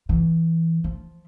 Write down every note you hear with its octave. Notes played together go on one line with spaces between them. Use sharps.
E3
F3